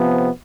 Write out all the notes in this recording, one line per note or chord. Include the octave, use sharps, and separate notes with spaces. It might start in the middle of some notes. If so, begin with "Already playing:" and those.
Already playing: C3 F3 B3